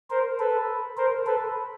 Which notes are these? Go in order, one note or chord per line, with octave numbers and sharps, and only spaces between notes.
A#4 C5
A4 B4
A#4 C5
A4 B4